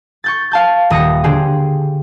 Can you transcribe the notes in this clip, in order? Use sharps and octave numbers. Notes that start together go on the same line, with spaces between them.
C#6 G6 A6
F5 A5 G6
D#1 D#6 A#6 C#7
D3 G4 G#4 C5